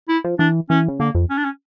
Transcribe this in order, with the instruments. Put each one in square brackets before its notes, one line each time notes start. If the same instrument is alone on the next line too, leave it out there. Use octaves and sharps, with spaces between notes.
[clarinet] E4
[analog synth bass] F3
[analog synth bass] E3 [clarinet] D4
[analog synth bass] E3 [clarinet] C#4
[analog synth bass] C#3
[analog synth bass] D3 [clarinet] A#3
[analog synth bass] F2
[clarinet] C#4
D4
C#4